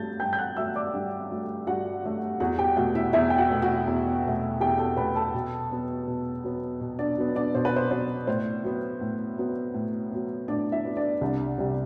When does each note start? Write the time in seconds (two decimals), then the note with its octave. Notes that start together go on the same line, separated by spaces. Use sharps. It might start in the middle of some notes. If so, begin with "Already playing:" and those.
Already playing: G2 F#3 A3 A5 G6 A6
0.20 G2 G5 G6
0.33 G6
0.39 F#5 F#6
0.57 F#3 A3 E5 E6
0.75 D5 D6
0.94 G2
1.31 F#3 A3
1.67 G2 F#4 F#5
2.03 F#3 A3
2.40 E2 F#4 F#5
2.59 G4 G5
2.76 B2 A3 F#4 F#5
2.95 E4 E5
3.13 E2 E4 E5
3.30 G5
3.38 F#4 F#5
3.50 B2 A3
3.62 F#4 F#5
3.88 E2
4.24 B2 A3
4.60 E2 G4 G5
4.78 A4 A5
4.97 B2 A3 B4 B5
5.15 A4 A5
5.34 B2
5.71 F#3 B3
6.08 B2
6.44 F#3 B3
6.81 B2
6.99 D4 D5
7.18 F#3 B3
7.35 D4 D5
7.55 B2 C5
7.65 B4
7.76 C5
7.91 F#3 B3 C5
8.27 A2 C5
8.64 F#3 B3
9.01 A2
9.38 F#3 B3
9.74 A2
10.11 F#3 B3
10.48 A2 D4 D5
10.72 E4 E5
10.85 F#3 B3
10.97 D4 D5
11.21 C2 D4 D5
11.58 C3 G3